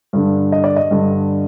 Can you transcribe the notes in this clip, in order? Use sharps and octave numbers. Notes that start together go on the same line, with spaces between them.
G2 D3
D#5
D5
D#5
G2 D3